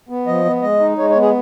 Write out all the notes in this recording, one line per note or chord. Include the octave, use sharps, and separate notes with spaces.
B3
F3 D#5
B3
G#3 D#5
D#4
G#3 C#5
C#5
B3
G#4